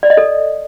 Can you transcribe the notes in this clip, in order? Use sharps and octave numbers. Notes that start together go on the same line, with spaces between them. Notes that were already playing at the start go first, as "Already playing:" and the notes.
D5
D#5
A4